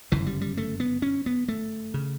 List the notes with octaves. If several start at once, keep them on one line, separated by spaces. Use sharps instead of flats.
G1 F#2 C#3 E3
G3
G3
A3
B3
C#4
B3
A3
C#3